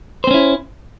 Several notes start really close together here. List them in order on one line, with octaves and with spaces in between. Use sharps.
C5 C4 C#4 E4